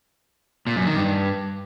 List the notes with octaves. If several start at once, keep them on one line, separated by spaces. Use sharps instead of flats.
A#2
F#2
D#3
G2